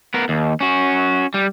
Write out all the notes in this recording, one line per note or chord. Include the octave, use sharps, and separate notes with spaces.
B3 A#4
D#2
C#4 F#4
G3